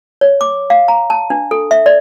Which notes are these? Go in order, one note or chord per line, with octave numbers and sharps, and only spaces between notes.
C#5
D6
F5
A#5
A5
D4
A4
E5
D5